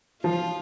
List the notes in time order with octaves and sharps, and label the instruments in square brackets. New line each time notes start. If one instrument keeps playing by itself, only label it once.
[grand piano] F3 [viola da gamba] F4